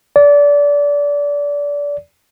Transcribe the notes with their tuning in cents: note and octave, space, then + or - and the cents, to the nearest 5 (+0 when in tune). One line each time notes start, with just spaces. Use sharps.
D5 -25